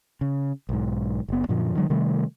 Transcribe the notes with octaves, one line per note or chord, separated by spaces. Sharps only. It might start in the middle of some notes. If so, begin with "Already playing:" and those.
C#3
B1 G#2
F#1 B3
F#2 A#2 D3 F3
D3 D#3 F#3 G#3
C3 D#3 G3 A3